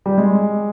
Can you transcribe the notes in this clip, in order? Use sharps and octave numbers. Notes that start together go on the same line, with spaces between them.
G3
G#3